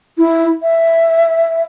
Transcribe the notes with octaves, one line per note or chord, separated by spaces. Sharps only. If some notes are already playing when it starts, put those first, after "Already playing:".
E4
E5